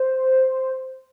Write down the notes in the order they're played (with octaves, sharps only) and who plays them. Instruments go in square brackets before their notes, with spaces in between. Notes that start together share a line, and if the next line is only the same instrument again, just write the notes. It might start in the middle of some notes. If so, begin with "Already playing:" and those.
Already playing: [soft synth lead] C5